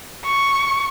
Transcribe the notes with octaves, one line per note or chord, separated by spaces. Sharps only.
C#6